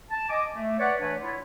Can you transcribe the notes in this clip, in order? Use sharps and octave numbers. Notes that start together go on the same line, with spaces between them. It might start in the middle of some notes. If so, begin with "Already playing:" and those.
A5
D#5 G#5 D6
A3
B4 C#5 D5 F#5
E3 A3 D4 B4 C#5
E4 F4 C#5